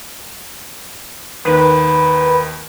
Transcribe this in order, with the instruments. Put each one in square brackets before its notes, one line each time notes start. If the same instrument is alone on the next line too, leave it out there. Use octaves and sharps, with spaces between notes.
[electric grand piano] D#2 D#3 [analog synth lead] B4